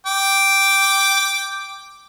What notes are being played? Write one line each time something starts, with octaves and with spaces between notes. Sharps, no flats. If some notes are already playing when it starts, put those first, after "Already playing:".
G5 D6